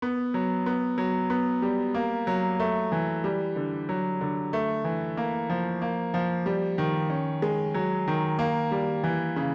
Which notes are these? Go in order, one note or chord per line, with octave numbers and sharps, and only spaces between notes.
B3
F#3
B3
F#3
B3
G3
A#3
F#3
A3
E3
G3
D3
F#3
D3
A3
E3
A#3
F3
A#3
F3
G3
D#3
C#4
G#3
F#3
D#3
A#3
G3
E3
C#3